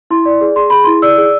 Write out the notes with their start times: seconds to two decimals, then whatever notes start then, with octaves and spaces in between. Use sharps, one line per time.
0.11 E4 C6
0.25 D5
0.41 G#4
0.56 G#4 C6
0.70 G#4 B5
0.84 E4 C6
1.02 D5 E6
1.18 G#4